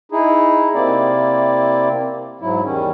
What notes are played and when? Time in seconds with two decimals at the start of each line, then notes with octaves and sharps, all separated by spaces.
0.12 D#4 E4 G#4
0.74 C3 A#3 C4 E4 D5
2.41 G#2 F#3 E4
2.64 E2 D#3 G3 C#4